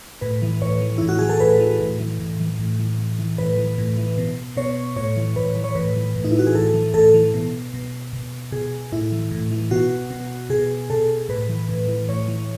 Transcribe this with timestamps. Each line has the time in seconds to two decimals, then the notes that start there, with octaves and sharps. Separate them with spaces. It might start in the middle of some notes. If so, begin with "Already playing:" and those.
0.21 A2 B4
0.42 E3
0.62 A2 C#5
0.82 E3
0.98 A2 E4
1.09 F#4
1.19 E3 G#4
1.29 A4
1.40 A2 B4
1.60 E3
1.80 A2
2.00 E3
2.19 A2
2.40 E3
2.59 A2
2.79 E3
2.99 A2
3.19 E3
3.38 A2 B4
3.57 E3
3.78 A2
3.97 E3
4.18 B2
4.57 B2 C#5
4.96 A2 C#5
5.16 E3
5.36 A2 B4
5.55 E3
5.64 C#5
5.75 A2 B4
5.96 E3
6.16 A2
6.24 D#4
6.31 E4
6.35 E3 F#4
6.46 G#4
6.55 A2 A4
6.74 E3
6.94 A2 A4
7.14 E3
7.34 B2
7.74 B2
8.13 B2
8.52 B2 G#4
8.92 A2 E4
9.12 E3
9.31 A2
9.51 E3
9.71 B2 F#4
10.11 B2
10.50 B2 G#4
10.90 B2 A4
11.29 A2 B4
11.49 E3
11.69 A2
11.88 E3
12.09 A2 C#5
12.28 E3